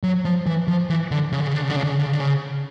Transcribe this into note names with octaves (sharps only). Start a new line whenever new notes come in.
F#3
F3
E3
F3
E3
D3
C#3
D3
C#3
D3
C#3
D3
C#3
D3
C#3
D3
C#3
D3
C#3